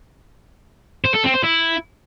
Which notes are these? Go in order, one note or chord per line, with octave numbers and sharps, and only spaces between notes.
C5
A4
C4
C5
E4